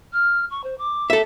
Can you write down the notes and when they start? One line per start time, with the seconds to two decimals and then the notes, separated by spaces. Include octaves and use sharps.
0.13 F6
0.50 C#6
0.64 C5
0.78 D6
1.10 A4 E5